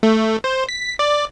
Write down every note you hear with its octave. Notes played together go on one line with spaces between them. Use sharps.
A3
C5
B6
D5